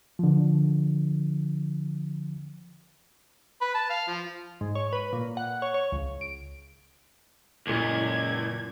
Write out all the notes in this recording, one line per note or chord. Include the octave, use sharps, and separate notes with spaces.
D3 F3
B4
A5
F5
F3
G#2
C#5
B4
A#2
F#5
C#5
C#5
C#2
D7
C#2 F#2 A#2 E4 G#6